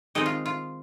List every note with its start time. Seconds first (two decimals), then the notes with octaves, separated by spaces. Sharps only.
0.15 D#3 G#3 C4 D#4 D#5
0.26 F4
0.46 F4